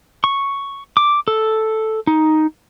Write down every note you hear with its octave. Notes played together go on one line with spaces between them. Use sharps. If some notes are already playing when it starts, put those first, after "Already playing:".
C#6
D6
A4
D#4